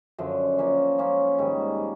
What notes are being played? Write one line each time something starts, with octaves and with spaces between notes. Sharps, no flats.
F#2 D3 F3
F3 A#3 C#4
F3 A#3 C#4
G#2 D#3 G3